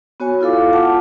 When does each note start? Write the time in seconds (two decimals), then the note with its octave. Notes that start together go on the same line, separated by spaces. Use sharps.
0.20 B3 F#4 C#5 G#5
0.41 E4 F4 A4 F5 D6
0.73 F4 F#5 A5 D6